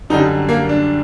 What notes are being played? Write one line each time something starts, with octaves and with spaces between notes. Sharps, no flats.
F#2 D3 G3 D#4
A#3
D4